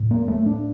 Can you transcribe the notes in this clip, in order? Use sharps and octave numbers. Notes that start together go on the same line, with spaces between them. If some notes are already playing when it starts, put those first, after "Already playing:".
Already playing: A2
A#3
A3
D4